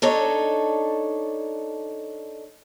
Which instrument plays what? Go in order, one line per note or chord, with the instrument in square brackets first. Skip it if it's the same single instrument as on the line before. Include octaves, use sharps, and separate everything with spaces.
[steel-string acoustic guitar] D4 D#4 A4 C#5